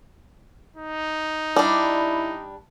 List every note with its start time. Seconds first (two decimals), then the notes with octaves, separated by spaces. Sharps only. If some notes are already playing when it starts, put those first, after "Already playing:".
0.77 D#4
1.56 G3 D4 E4